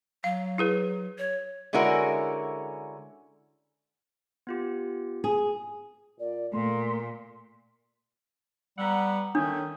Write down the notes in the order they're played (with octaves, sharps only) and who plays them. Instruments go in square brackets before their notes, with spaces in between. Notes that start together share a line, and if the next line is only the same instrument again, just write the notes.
[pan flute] F#3 [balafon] F5
[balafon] E4 G#4 B4
[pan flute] C#5
[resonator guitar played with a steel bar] D3 G#3 C#4 E4 F#4 A#4
[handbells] B3 F4 G4
[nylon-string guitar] G#4
[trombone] A#2 [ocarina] D5
[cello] A#2 [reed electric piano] A3 [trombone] A#3 [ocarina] C6
[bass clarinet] G3 [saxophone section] B3 F#5 [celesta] A#5 E6
[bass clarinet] D#3 [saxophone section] A3 C#4 [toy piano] D4 [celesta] D#6 G6